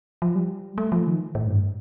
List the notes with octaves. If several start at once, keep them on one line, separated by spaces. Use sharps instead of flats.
F3
G3
A3
F3
D#3
A2
G2